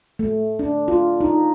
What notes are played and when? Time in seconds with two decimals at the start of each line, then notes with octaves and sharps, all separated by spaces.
0.19 A3
0.59 D4
0.88 F4
1.21 D#4